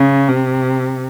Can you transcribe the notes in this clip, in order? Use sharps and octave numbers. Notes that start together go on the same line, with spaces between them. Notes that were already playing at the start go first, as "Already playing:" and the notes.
Already playing: C#3
C3